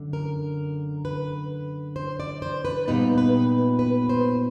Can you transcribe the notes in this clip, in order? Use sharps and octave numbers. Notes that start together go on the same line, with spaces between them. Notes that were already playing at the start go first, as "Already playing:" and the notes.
Already playing: F#2 D3
A#4
B4
C5
D5
C5
B4
A#2 G3 B3 D#4 B4
B4
B4
C5